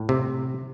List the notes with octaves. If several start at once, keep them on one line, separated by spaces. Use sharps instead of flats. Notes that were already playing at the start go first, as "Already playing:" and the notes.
Already playing: A2
C3